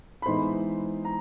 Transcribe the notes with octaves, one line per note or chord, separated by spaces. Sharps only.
B5
E3 G#3 B3 D#4 C5 C6
A#5